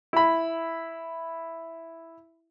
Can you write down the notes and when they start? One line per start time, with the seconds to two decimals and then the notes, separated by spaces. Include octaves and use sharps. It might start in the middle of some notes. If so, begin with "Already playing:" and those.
0.13 E4 B5